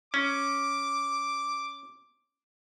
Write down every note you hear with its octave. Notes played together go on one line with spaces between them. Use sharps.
C#4 D6